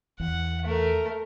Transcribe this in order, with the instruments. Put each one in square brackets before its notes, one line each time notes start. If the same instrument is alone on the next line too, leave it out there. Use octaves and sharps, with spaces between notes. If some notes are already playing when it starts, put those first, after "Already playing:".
[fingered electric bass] E2 [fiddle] F#5
[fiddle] A3 A#4